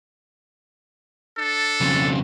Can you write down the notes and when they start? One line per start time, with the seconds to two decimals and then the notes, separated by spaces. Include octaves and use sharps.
1.37 D4 A4
1.81 F2 C#3